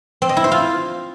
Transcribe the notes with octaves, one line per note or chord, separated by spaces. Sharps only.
C4
D#5
E4
C5
F4